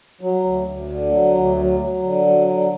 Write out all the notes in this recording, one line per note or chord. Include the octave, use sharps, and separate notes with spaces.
F#3
D2
D2
D3
F#3
D2
F#3
F#3
D3
F#3
D3